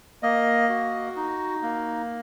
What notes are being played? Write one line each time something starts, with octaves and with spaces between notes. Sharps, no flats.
A#3 D#5
F#4
D#4
A#3